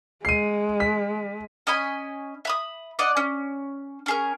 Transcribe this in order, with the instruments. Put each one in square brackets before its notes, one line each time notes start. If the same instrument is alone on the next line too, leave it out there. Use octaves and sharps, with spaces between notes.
[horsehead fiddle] G#3 [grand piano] C7 D#7
[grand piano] B6
[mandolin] C#4 D#5 G#5 B5
E5 B5 D#6
D5 D#5 F#5
C#4
C#4 G#4 A#4